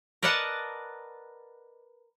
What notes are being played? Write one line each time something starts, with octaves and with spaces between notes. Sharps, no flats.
A#4 B4 D5 D#5 F#5 A5